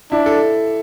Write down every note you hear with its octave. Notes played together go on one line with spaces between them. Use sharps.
D4 E4
A4